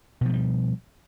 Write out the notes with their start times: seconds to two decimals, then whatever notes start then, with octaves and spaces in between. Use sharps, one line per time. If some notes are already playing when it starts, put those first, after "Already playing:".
0.21 B2
0.25 F3
0.29 A3
0.33 G3